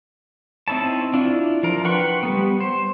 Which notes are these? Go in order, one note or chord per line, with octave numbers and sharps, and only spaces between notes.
C4 D#4 E4 C#5 A5
D4 E4 F4
F3 A#4
B4 F#5 G5 C6 C#6
G3 A3 B3
C5